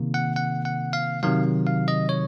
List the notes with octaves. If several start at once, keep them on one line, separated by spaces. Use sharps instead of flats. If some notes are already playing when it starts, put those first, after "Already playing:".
Already playing: C3 D#3 A#3
F#5
F#5
F#5
F5
C3 D#3 F#3 F5
F5
D#5
C#5